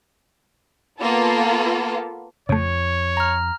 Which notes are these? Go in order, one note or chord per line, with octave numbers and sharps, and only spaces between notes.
A#3 B3 F4 A4
F2 C#3 A3 C#5
A#5 F6